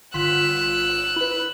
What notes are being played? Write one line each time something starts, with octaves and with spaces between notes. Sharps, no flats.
G1 F4 E6 F#6 B6
E4 B4